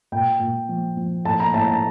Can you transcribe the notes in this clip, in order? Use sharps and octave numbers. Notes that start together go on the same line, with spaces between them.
A#2 G5
A#2
F3
F3
A2 A5
A#5
A2 A5
A5